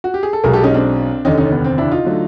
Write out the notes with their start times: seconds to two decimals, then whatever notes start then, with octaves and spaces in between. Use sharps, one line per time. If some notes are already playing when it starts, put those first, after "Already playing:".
0.04 F#4
0.14 G4
0.23 G#4
0.33 A4
0.44 B1 B2 G#3 G#4 A#4
0.53 G4 A4
0.63 C#4 D#4
0.74 C4 D4
1.25 F1 D#2 D3 C#4 D#4
1.37 C#4 D#4
1.51 B3
1.64 C4
1.78 D4 E4
1.91 D#4 F4
2.05 D3 F#3 A3